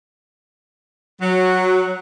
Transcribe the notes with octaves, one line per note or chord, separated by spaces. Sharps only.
F#3